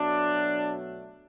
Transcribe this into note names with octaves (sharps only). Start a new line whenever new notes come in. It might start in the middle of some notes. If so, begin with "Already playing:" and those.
Already playing: B2 F#3 A3 D4